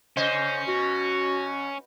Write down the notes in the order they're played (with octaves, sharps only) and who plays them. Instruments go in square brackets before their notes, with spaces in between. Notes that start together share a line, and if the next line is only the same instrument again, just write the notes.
[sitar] C#3 C5 D#5 [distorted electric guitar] C#4
[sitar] B2 [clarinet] F#4